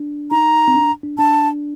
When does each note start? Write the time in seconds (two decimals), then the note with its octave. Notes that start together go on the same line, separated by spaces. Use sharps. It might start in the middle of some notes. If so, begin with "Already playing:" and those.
Already playing: D4
0.31 D#4 A#5
0.68 C4
0.75 D4
1.03 D4
1.18 D4 A5